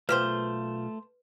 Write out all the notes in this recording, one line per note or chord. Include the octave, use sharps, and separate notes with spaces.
B1 A3 A#3 F4 G4 B4 C5